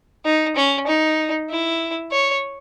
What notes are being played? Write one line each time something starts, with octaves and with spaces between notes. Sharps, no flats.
D#4
C#4
D#4
E4
C#5